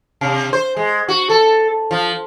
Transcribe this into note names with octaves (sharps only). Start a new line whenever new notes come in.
C3
C5
G#3
F#4
A4
F3